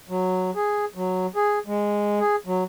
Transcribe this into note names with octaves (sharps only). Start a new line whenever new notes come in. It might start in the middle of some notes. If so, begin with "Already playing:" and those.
F#3
G#4
F#3
G#4
G#3
G#4
F#3